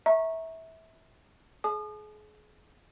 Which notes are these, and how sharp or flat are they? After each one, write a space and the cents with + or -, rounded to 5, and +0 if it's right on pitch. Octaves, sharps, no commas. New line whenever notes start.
E5 -25 A#5 -5 C#6 -15
G#4 +35 G#5 +45 D#6 -35